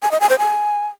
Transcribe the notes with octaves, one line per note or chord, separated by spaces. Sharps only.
G#5
D#5
G#5
C5
G#5